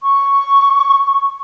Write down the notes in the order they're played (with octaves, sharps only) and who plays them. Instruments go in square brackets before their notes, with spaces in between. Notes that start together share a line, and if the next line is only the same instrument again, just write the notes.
[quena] C#6